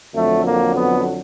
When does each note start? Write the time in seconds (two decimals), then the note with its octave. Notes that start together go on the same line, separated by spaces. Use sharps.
0.14 F2 D3 F#3 A3
0.44 A#3
0.74 B3